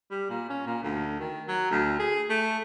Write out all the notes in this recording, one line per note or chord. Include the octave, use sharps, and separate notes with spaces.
G3
A#2
C#4
A#2
D2
D#3
F#3
D2
G#4
A3